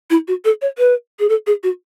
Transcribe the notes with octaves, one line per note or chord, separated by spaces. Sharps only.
E4
F#4
A4
C#5
B4
G#4
A4
G#4
F#4